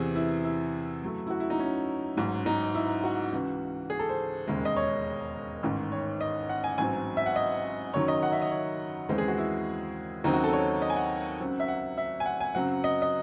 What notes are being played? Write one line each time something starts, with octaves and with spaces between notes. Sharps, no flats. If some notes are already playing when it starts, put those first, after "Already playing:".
Already playing: E2 C3 E3 G#4
E4
E4
F#2 C#3 F#3 A3
E4
F#4
E4
D#4
C#4
A1 G#2 F#3
D#4
E4
F#4
C#2 C#3 E3
G#4
A4
C5
E1 D#2 C#3 G#3
D#5
C#5
A1 G#2 D#3
C#5
D#5
F#5
G#5
A1 G#2 F#3 C4 G#5
E5
F#5
D#5
F#1 F#2 D#3 F#3 C#5
D#5
F#5
E5
D#5
C#5
D#2 C#3 E3 G#3 C4 C5
G#4
F#4
E4
D#2 C#3 F#3 C4 D#4
F#4
A4
C#5
D#5
G#5
F#5
C#2 C#3 F#3 C4
E5
F#5
E5
G#5
F#5
G#5
F#2 C#3 F#3 C4 F#5
D#5
D#5